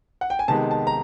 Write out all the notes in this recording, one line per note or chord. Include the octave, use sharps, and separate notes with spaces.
F#5
G5
G#5
C3 D#3 G#3 B3 A5
A5
A#5